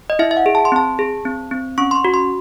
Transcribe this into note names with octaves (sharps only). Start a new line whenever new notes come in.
D#5
E4 E5
E5
F#5
G#4
A5
C6
C4 A5
G#4
C4
C4
C#4 C#6
C6
C#6
F#4
C6